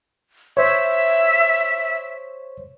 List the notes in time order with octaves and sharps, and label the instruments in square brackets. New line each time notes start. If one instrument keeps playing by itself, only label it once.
[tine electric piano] C5 C#5 [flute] E5